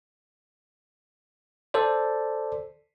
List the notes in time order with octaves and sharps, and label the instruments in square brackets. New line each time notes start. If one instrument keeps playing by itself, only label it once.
[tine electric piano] A4 C5 D5